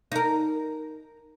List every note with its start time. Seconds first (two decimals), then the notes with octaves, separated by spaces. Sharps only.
0.12 D#4 A#4